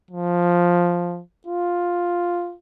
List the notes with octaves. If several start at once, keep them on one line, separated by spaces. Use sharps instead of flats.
F3
F4